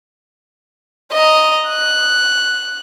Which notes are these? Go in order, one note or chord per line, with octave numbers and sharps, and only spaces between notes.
D#5 A#5
F#6